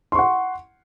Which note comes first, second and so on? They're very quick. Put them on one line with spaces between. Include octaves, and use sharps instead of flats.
C6 C#6 F#5